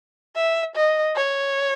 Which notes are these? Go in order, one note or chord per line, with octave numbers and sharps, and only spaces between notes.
E5
D#5
C#5